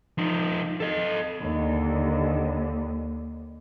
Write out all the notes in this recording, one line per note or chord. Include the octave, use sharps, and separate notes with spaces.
F3 D#4
A4 D#5
D#2 D3